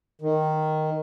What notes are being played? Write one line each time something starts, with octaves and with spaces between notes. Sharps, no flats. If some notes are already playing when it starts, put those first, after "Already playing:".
D#3